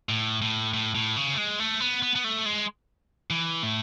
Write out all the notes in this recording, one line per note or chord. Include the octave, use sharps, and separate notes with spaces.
A2
A2
A2
A2
C#3
A3
G#3
A3
B3
B3
B3
A3
G#3
E3
A2